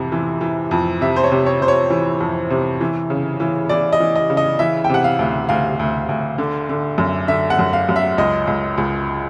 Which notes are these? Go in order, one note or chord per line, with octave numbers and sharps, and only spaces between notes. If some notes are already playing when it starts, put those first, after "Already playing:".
Already playing: F2 C3 E3
E3
E3
F2
C3 E5
C5
C#5
C3
C#5
C3 C5
C#5
E3
F2
C3
E3
C#3
E3
E3 D5
D#5
E3
D#5
C#3
D#5
E3 E5
G5
C3 F#5
F5
D2
D2 F5
D2
D2
D3
D3
F#2
D3 E5
F#5
F#2
F5
F#2
E5
C#2 D#5
C#2
C#2